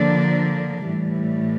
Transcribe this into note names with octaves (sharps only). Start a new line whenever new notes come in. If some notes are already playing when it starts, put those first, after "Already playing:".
Already playing: D3 F3 A#3 D4
A2 E3 G3